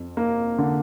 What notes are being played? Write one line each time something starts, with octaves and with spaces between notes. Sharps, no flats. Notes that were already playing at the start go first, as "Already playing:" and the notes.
Already playing: F2
A#3
D3